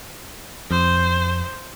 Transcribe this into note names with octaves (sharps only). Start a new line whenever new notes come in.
F2 C5